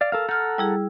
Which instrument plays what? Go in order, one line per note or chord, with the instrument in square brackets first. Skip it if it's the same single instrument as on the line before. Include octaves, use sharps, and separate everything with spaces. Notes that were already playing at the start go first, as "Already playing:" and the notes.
[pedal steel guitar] D5 F5
A4 A#4 F5
[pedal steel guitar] A4 F#5 A#5 [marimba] F6 G6
[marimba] G3 E4 G#4